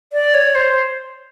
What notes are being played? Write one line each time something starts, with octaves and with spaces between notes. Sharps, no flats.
D5
C#5
C5